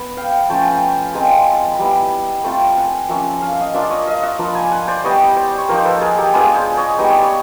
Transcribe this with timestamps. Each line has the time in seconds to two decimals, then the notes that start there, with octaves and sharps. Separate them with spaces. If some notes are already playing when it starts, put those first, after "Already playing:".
Already playing: B3
0.17 F5 G5
0.49 F3 A3 C#4 G5 A5
1.14 G#3 C4 F4 G#5 A#5
1.72 B5
1.79 G3 B3 E4 G#5 A#5
2.44 A3 C4 F4 G5 A5
2.77 F#5 G#5
3.09 F3 A#3 C#4 E5 F#5
3.42 F5
3.52 E5
3.61 D#5 F5
3.74 A#3 D4 F4 D5 E5
3.90 C#5 D#5
4.07 D#5 F5
4.23 E5 F#5
4.39 F3 A#3 D4 F4 A5 B5
4.55 G#5 A#5
4.71 F#5 G#5
4.88 C5 D5
5.04 G3 B3 E4 C#5 D#5
5.36 C5 D5
5.58 C#5
5.69 F3 A#3 D#4 A#4 C5
5.85 A4 B4
6.01 G#4 A#4
6.18 G4 A4
6.34 G#3 B3 D4 F4 G#4 A#4
6.56 C5 D5
6.77 C#5 D#5
6.99 G3 B3 D#4 D#5
7.11 D5
7.23 C#5